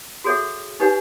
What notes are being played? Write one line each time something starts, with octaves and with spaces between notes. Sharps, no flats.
F#4 G#4 A4 C#5 E5 F#5
D#4 G4 B4 C#5 F#5 G#5